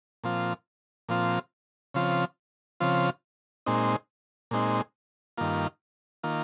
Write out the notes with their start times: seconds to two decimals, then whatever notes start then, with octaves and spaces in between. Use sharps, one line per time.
0.24 A#2 F3 C4 F4
1.09 A#2 F3 C4 F4
1.94 C#3 F3 C4 F4
2.80 C#3 F3 C4 F4
3.66 A#2 G#3 C4 D#4
4.51 A#2 G#3 C4 D#4
5.38 G2 D#3 A#3 F4
6.23 D#3 A#3 F4